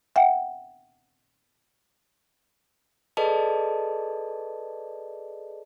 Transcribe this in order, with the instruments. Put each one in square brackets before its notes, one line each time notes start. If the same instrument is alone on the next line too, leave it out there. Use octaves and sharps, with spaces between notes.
[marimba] E5 F#5 G5
[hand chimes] G#4 A4 B4 D5 D#5 A5